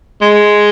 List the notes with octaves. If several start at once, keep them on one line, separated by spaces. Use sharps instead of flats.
G#3